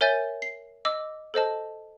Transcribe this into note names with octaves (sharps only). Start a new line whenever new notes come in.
A#4 C#5 E5 G#5 G6 A6
C7
D#5 D6 E6
A4 C5 D#5 A5